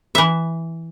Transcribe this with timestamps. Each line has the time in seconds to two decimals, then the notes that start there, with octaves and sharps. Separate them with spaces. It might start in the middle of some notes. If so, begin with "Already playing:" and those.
0.15 E3 E5